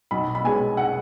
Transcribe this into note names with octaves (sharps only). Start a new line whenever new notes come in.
B1 B5
B5
B2 G#3 G#5
F#5